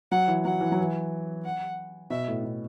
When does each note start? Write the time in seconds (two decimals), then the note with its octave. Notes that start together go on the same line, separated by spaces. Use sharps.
0.12 F#3 F#5
0.28 E3
0.45 F#3 F#5
0.61 E3
0.72 F#3
0.81 E3
1.44 F#5
2.10 B2 E5
2.28 A2
2.44 B2